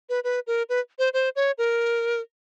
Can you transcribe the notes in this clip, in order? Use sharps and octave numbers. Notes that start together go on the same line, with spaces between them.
B4
B4
A#4
B4
C5
C5
C#5
A#4